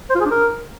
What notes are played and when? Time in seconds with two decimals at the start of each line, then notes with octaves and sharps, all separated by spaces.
0.10 C5
0.15 F4
0.20 G#4
0.26 D4
0.31 A#4